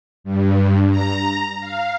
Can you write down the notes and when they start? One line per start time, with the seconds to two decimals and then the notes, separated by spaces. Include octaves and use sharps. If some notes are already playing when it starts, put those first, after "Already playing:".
0.24 G2
0.91 A#5
1.60 F5